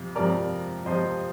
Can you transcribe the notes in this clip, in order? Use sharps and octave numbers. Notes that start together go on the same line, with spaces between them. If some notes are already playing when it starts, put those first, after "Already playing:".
Already playing: F2 C3 F3
F2 C3 F3 A#4 D5
F2 C3 F3 C5 D#5